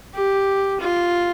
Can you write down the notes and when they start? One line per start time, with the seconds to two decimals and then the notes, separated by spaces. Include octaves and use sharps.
0.15 G4
0.80 F4